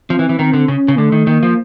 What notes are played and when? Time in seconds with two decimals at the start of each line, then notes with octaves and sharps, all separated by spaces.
0.09 F3 C4
0.19 E3
0.29 E3
0.39 D#3 C4
0.54 D3
0.68 C#3 C#4
0.88 C#3
0.98 D3 A3
1.12 D#3
1.27 D#3 A#3
1.43 F3